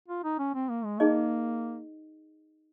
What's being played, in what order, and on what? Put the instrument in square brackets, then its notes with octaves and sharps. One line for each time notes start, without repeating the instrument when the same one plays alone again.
[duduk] F4
D#4
C#4
C4
A#3
G#3
[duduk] A#3 [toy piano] D#4 G#4 D#5